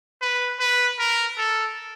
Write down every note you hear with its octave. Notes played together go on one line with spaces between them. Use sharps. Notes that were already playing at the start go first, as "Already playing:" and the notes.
B4
B4
A#4
A4